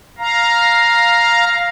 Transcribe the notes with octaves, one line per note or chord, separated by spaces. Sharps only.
F5 A#5